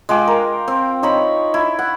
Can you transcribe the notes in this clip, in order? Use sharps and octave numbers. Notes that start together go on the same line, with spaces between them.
G#3 F4 G5 D6
A#4
C4
D#4 C#5 B5
E4
F#5